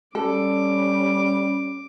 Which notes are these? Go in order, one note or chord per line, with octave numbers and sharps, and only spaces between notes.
G3 C#4 A4 D6